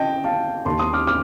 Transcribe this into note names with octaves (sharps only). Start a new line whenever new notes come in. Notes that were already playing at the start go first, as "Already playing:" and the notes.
Already playing: D#5 G5 A5
F5 A5
D#2 D#3 A#3 A5 C6
C6 D#6
D6 F6
D6 F6